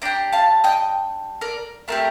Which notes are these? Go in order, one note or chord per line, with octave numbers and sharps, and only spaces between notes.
D4 G4 G5 A#5
F5 A5
D#5 G5
A#4 D5
A3 C4 G4 A#4